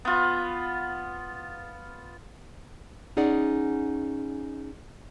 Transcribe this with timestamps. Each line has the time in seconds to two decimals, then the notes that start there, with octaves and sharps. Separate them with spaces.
0.05 B3 F4
3.17 C#4 D#4 G#4 D5 F#5